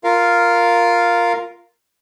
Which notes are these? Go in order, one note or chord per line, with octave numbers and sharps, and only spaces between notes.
F4 A#4 F5